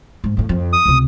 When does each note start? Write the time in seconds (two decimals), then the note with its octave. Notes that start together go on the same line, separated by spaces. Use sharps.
0.24 G#2
0.37 F#2 A2
0.49 F2
0.73 D#6
0.85 C#2 C3